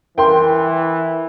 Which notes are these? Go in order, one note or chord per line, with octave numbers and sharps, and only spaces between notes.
E3 A#4 F#5 G5 C6